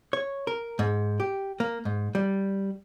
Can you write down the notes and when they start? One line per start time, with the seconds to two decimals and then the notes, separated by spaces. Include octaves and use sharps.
0.13 C#5
0.47 A#4
0.79 G#2
1.20 G4
1.60 A#3
1.85 G#2
2.15 G3